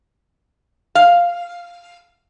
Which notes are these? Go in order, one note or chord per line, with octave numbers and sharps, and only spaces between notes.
F5